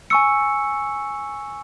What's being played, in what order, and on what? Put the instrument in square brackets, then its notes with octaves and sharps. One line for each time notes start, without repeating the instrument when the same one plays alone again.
[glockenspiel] G#5 C#6 E6 C#7